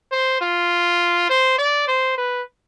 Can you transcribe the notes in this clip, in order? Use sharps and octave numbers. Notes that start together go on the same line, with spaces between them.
C5
F4
C5
D5
C5
B4